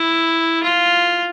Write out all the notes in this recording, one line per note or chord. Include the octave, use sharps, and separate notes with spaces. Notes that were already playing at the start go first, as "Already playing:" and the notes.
Already playing: E4
F4